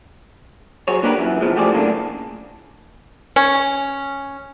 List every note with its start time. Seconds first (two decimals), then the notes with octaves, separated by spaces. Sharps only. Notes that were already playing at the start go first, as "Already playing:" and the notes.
0.88 F#3 G#4 C5 C#5
1.03 D3 A#3 D4 G4 A#4 B4
1.18 F#2 E3
1.41 B2 E3 F3 G#3
1.56 F3 A3 G4 G#4 C5 D5
1.72 F#2 A2 C#3 A#3 C4 D4
3.36 C#4